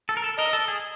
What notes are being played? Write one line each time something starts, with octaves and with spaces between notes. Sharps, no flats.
A4
A#4
A4
A#4 D#5
A4
G#4